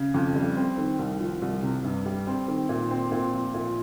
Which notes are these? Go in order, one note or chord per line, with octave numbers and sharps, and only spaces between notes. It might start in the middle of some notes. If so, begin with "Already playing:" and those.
Already playing: C#3
F2
G3
C4
D#3
C2
F3
C2
C3
G2
G3
C4
D#3
A#2
C4
A#2
F3
A#2